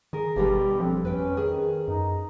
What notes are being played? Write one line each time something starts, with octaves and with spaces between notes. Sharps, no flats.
D#3 G#4 A#4
G1 B2 D3 G3 G4
F3 C4
F2 C#4 B4 G5
D#3 G#4
F#2 D#4